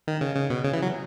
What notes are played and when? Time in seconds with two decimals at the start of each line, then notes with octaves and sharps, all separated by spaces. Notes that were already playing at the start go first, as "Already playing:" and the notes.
0.08 D#3
0.21 C#3
0.36 C#3
0.50 B2
0.64 C#3
0.73 E3
0.82 F#3